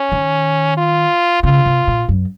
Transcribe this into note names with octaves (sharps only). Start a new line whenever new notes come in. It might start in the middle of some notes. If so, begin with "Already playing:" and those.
Already playing: C#4
D#3
F4
C#3 F4
C3
A#2
F#2